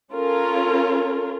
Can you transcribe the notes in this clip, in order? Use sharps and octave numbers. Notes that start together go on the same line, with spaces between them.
C#4 F4 A4 A#4